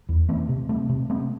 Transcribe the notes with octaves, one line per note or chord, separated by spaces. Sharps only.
E2
E3 A3 C4
C3
A3 C4
C3
A3 C4